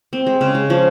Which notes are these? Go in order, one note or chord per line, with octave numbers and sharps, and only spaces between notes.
C4
G#3
C#3
G#3
F3